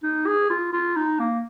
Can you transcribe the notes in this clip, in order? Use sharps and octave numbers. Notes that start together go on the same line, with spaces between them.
D#4
G#4
F4
F4
D#4
A#3